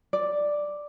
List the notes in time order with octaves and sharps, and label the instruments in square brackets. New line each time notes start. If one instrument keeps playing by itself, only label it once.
[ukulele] D5